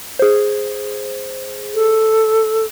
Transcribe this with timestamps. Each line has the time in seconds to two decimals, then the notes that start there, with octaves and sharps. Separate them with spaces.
0.19 G#4 C5
1.74 A4